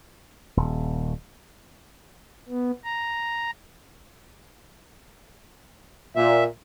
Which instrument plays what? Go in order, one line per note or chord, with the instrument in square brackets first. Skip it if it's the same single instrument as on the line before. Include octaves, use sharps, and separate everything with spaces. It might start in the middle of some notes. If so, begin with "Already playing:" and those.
[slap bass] D#1
[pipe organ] B3
A#5
[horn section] A#2 [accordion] E5